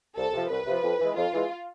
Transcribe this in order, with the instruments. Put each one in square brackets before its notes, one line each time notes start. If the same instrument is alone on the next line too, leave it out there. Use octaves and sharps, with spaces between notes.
[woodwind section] C2 [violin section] A4
[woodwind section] C3 F3
[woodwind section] C2 [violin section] B4
[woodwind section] C3 F3
F2
E3 G#3
[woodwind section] F2 [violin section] F4
[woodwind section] E3 G#3